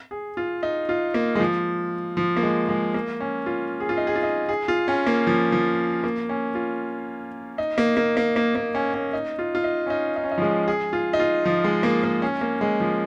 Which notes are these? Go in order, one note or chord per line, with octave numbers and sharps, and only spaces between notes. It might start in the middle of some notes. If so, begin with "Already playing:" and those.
G#4
F4
D#4
F4
A#3
G#3
F3
F3
A#3
G#3
G#3
A#3
C#4
F4
G#4
F4
D#4
G#4
F4
D#4
G#4
F4
C#4
A#3
F3
F3
A#3
C#4
F4
D#4
A#3
A#3
A#3
A#3
A#3
C#4
C#4
D#4
F4
F4
D#4
C#4
D#4
D#4
C#4
D#4
F3
G#3
G#4
F4
D#4
F4
F3
G#3
A#3
A#3
C#4
A#3
G#3
F3